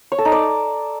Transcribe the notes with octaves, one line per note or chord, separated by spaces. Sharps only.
C#5
A4
D#4
D5